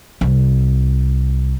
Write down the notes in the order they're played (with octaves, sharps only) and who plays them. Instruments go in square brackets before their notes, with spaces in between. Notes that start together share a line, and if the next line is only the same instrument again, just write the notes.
[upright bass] C2